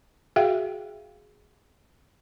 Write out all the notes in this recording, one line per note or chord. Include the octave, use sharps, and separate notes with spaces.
F#4 G#4 E5 F5 G5